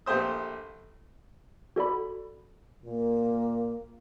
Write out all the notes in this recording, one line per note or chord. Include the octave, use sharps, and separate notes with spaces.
A#1 A3 G4 C5 D#6
F#4 A4 D5 B5
A#2 A#3